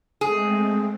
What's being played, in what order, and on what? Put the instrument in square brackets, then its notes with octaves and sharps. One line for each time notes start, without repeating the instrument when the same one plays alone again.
[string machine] G#3 A3 C4 [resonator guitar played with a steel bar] G#4